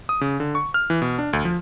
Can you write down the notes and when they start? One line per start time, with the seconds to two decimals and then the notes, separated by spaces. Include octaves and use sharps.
0.09 D#6
0.21 C#3
0.40 D3
0.55 C#6
0.74 F6
0.90 E3
1.02 B2
1.19 D4
1.33 D2
1.45 F3